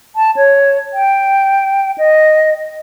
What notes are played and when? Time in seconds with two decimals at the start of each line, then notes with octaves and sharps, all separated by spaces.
0.16 A5
0.37 C#5
0.93 G5
1.98 D#5